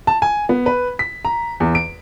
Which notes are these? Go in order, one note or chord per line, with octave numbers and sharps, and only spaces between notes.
A5
G#5
B3
B4
B6
A#5
E2
D7